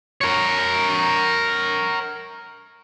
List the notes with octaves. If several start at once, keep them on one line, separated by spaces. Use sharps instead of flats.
A#4 C#5